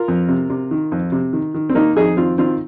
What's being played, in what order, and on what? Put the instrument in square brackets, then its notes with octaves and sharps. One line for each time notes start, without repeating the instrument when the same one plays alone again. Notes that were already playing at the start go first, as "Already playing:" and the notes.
Already playing: [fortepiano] F4 A#4
F2
C3
C3
D#3
F2
C3
D#3
D#3
C4
D#3 A#3 D#4
F2 D#4 G#4
D#3 C4 F4
D#3 C4 F4